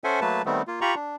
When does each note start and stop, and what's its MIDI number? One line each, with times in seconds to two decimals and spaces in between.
0.04 0.20 61
0.04 0.20 69
0.04 0.20 72
0.04 0.20 76
0.04 0.20 78
0.04 0.20 80
0.21 0.42 54
0.21 0.42 57
0.21 0.42 58
0.21 0.42 71
0.21 0.42 81
0.46 0.62 51
0.46 0.62 55
0.46 0.62 57
0.46 0.62 59
0.46 0.62 60
0.68 0.80 58
0.68 0.80 65
0.81 0.95 65
0.81 0.95 67
0.81 0.95 82
0.81 0.95 83
0.81 0.95 85
0.95 1.16 62